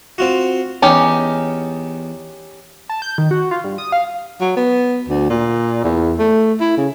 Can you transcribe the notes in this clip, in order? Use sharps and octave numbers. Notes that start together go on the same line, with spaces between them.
C4 F4 F#4
E2 C#4 D#4 G4
A5
G6
D#3
F#4
F4
G2
D#6
F5
F#3
B3
D2
A#2
E2
A3
E4
C#3